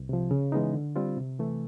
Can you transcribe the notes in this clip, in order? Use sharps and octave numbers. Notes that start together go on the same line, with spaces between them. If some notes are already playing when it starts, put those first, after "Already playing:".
Already playing: C2
C3 F3
C#3
E3 G#3 B3 D#4
D3
G3 C4 F4
C3
E3 A3